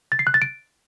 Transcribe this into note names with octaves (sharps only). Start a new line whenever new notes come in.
A6
C7
F#6
A6
D7